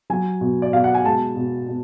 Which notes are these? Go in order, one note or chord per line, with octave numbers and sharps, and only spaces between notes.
F#3 G#5
B2
D5
B2 F5
F#5
G#5
G#3 A5
B2
B2